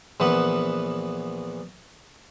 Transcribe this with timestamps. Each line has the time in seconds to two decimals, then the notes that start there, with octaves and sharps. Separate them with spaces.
0.20 A#1 E3 B3 E5 F#5